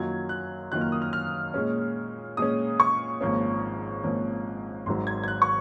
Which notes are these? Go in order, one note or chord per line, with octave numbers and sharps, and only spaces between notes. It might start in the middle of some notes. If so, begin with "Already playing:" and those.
Already playing: F#2 D#3 F#3 A#3 F4 G#6
F#6
F#2 D#3 F#3 A#3 F4 F#6
F6
D#6
F6
F6
A#2 G#3 C#4
A#2 G#3 C#4 D#6
C#6
G#1 G#2 F3 A#3 C#4
G#1 G#2 F3 A#3 C#4
G#1 G#2 D#3 F#3 C6
G#6
G#6
F#6
C#6